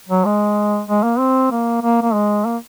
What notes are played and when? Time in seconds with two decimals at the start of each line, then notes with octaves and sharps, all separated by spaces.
0.09 F#3
0.25 G#3
0.88 G#3
1.03 A#3
1.19 C4
1.51 A#3
1.82 A#3
2.02 A#3
2.14 G#3
2.45 A#3